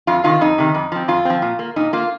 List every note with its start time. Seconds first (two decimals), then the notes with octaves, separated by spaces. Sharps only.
0.07 F2 F4
0.24 C3 D#3 F4
0.41 F2 D#4
0.58 C3 D#3
0.74 F2
0.92 F3 C4
1.08 F2 F4
1.25 F3 C4
1.42 A#2
1.59 A#3
1.76 A#2 D#4
1.93 A#3 F4